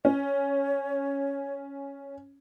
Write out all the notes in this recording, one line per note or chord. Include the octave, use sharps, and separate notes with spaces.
C#4 C#5